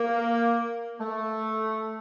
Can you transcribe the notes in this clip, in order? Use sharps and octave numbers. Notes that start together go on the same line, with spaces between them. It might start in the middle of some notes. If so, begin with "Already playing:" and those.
Already playing: A#3
A3